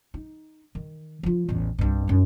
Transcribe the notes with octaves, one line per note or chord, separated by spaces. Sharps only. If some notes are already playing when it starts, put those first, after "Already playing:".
D#4
D#3
F3 F4
A1 E2
C2 G2
F#2 D#4